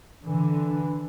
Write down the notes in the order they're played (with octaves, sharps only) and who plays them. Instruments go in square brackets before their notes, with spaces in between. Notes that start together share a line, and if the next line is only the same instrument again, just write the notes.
[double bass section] D3 [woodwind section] E3